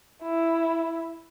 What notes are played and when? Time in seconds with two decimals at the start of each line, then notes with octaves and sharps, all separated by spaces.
0.23 E4